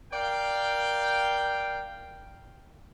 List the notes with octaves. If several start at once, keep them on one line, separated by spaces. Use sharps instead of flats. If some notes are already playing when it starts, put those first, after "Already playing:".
A#4 D5 F5 G5